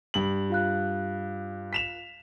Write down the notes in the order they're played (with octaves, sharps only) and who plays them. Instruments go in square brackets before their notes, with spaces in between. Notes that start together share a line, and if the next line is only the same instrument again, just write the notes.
[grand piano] G2 F#7
[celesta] F4 F5 F#6
[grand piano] B6 E7 F7